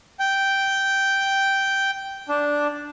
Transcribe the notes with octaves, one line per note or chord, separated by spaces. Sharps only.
G5
D4